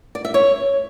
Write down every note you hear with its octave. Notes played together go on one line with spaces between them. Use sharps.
D5
E5
C#5